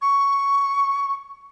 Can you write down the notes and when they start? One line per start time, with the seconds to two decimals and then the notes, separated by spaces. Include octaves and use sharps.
0.01 C#6